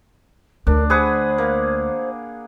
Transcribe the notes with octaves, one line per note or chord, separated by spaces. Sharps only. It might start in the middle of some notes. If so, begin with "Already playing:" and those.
D2 D4 A#4
G#4 B4 C5 F#5
A#3